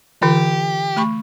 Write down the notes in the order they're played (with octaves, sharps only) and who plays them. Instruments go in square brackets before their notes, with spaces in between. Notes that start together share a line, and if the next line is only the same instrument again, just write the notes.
[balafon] D3 E3 F4 [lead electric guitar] G4
[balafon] A3 B5 C#6